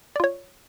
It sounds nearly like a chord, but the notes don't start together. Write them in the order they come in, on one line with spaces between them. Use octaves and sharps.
D5 F4 C#5